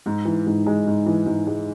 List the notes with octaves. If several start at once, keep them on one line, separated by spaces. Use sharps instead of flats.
G#2
E3
G#2
G#3
G#2
E3
G#2
G#3